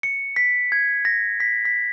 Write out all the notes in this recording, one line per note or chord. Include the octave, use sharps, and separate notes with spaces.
C#7
B6
G#6
A#6
B6
B6